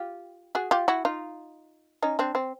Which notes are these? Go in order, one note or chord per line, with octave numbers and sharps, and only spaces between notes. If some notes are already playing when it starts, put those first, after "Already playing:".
Already playing: F4 G4
F#4 G#4
F4 G4
E4 F#4
D#4 F4
C#4 D#4
C4 D4
C4